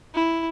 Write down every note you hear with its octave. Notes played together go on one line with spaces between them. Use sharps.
E4